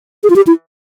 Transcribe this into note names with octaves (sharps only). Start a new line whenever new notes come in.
G#4
F4
G4
E4